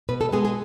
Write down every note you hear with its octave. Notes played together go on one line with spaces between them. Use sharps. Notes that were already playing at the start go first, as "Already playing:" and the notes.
B2 B4
A4
G#3 B3 G#4
G#4